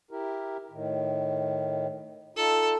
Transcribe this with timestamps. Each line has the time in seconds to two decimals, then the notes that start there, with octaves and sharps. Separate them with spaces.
0.11 E4 G4 A#4
0.71 A2 D#3
2.36 D#4 F4 A4